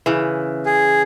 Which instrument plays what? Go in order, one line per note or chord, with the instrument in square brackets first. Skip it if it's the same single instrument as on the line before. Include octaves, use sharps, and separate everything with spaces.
[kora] C#3 E3
[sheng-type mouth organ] G#4